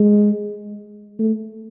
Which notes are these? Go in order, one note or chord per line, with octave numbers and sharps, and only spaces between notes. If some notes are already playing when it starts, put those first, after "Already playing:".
Already playing: G#3
A3